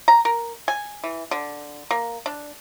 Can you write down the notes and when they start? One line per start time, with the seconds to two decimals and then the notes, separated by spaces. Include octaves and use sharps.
0.08 A#5
0.25 A#4
0.68 G#5
1.04 E3
1.31 D3
1.91 A#3
2.26 D4